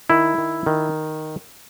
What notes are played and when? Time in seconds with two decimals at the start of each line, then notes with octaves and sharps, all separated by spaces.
0.10 D#3 E4
0.38 D#3
0.66 D#3